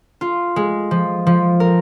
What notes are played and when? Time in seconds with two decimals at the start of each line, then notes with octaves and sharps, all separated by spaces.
0.21 F4
0.56 G#3
0.91 F3
1.27 F3
1.60 A#4